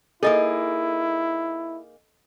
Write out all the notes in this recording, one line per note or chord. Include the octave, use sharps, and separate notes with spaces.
A#3 D#4 E4 G#4 A4 D#5 D#6